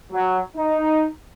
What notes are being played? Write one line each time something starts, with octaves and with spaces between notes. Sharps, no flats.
F#3
D#4